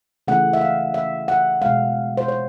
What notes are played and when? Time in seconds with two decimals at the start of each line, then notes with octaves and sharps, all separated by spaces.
0.28 C#3 E3 A3 F#5
0.53 E5
0.61 F5
0.94 E5
1.28 F#5
1.61 B2 G#3 F5
2.17 C5
2.28 C#5